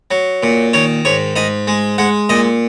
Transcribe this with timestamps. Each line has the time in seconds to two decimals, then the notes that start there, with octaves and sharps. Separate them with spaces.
0.11 F#3
0.43 A#2
0.73 D#3 C#5
1.05 G#2 C#5
1.36 G#2 D#5
1.67 G#3
1.98 G#3 F#5
2.29 A#2 D#5